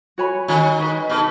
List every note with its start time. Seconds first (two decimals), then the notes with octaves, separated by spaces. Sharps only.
0.18 F#4 C#5 G#5 B5
0.48 D#3 F#4 C#5 G#5 B5
0.79 D#4 G#4 B4
1.09 B2 D#4 G#4 B4